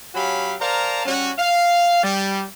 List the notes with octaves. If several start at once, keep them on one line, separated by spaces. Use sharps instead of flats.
F#3 C#4 F#4 G4 F5 B5
A#4 C5 D5 F5 A5 A#5
G3 C#4 F#4
F5
G3